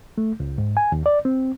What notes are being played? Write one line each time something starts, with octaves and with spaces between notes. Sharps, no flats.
A3
C#2
G#2
G#5
D#2
D5
C4